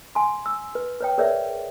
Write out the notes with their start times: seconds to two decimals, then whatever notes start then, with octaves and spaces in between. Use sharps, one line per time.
0.15 G#5 C6
0.46 E6
0.75 B4
1.01 B4 C#5 G5
1.18 G#4 A#4 B4 C#5 D5 E5